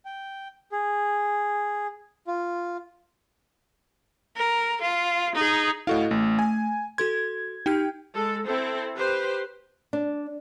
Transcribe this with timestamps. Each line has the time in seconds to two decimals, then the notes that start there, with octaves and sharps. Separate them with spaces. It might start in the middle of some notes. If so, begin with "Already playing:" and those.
0.05 G5
0.72 G#4
2.27 F4
4.37 A#4
4.81 F4
5.35 D#4 G#4
5.87 A2 E4 F#4 A4 D#5 F5
6.11 A1 A3
6.39 G#5
6.98 F#4 A4 C6 G#6
7.66 D#4 G4 G5 F6
8.14 G#3 A4
8.46 C4 E4 A4 C5
8.96 G4 B4 C5
9.93 D4